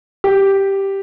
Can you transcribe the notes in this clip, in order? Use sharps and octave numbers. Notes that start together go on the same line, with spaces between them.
G4